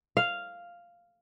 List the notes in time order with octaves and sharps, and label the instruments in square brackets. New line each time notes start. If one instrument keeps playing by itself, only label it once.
[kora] F5